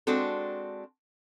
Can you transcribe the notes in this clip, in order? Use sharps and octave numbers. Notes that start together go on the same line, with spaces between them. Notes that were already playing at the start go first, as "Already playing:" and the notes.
G#3 C4 D4 F#4 A4